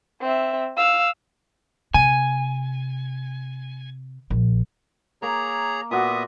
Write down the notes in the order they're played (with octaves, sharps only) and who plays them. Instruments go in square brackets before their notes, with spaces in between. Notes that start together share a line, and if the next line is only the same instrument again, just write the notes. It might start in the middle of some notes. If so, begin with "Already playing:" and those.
[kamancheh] C4 E5
F5 E6
[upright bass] C3 [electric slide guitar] G#5
[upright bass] A#1
[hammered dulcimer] A#3 [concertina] G#4 C#5 A#5
[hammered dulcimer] A#2 F#4 [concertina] B3 E5 D#6